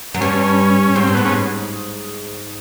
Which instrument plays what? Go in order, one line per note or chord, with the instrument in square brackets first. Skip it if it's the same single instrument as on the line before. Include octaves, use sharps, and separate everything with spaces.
[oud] F#2
[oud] G2 [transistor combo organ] C#4
[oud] G#2 [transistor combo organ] C4
[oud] G2
[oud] G#2 [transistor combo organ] B3
[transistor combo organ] C#4